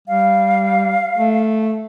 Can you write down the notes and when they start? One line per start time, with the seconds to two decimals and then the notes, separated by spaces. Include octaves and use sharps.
0.08 G3 F5
1.18 A3